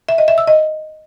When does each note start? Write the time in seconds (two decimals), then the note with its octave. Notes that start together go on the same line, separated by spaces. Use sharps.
0.09 E5
0.18 D#5
0.28 E5
0.38 E6
0.47 D#5